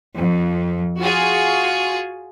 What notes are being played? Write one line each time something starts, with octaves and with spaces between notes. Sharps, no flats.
F2
F4 F#4 G#4